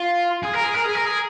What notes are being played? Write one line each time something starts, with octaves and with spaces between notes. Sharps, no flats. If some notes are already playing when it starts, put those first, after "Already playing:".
Already playing: F4
G#4
A#4
G#4
A#4
G#4
A#4
G#4